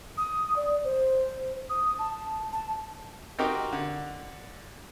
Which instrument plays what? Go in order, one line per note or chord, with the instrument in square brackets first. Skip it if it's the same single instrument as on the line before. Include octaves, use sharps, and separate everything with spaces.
[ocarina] D#6
D5
C5
D#6
A5
A5
[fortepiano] C4 D#4 F#4 G4 A#4
D3